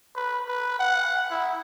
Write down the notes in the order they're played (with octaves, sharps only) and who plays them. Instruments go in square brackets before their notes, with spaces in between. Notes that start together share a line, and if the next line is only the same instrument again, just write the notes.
[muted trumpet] B4
B4
F#5
E4